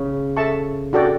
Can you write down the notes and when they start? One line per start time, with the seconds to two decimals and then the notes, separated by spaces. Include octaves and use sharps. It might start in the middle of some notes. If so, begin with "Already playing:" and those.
Already playing: C#3
0.37 A4 E5 A5 C#6
0.93 D4 F#4 A4 D5 G5